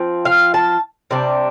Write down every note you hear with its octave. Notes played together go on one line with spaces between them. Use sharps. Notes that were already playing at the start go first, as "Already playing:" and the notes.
Already playing: F3 C4
F5
A5
C3 G3 D4